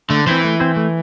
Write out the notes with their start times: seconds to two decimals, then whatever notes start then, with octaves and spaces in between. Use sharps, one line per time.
0.10 D3 A3
0.26 E3 C4 E4 C5
0.44 A3
0.60 C4 E4 C5
0.77 A3